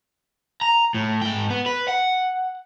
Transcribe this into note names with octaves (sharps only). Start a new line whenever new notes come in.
A#5
A2
G#2 G5
B3
B4
F#5